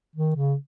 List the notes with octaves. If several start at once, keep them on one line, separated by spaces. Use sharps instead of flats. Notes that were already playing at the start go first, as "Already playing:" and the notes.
D#3
C#3